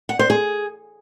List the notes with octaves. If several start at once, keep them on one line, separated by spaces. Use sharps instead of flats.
F#5
C5
G#4